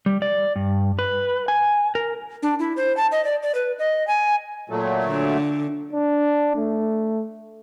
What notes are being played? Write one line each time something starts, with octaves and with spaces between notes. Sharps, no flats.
G3
D5
G2
B4
G#5
A#4
D4
E4
C5
A5
D#5
D5
D5
B4
D#5
G#5
A#2 F#3 A3
D3
D4
A3